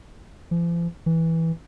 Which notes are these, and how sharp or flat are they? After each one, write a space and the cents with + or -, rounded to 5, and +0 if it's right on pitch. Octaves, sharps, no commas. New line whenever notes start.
F3 -45
E3 -10